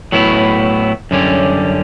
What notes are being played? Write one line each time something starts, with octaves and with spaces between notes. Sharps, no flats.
A2 F#3 B3 E4
F#2 D3 G3 C#4